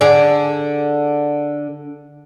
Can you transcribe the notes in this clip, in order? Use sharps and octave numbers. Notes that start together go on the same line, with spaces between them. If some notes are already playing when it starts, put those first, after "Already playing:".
D3 G#4 D5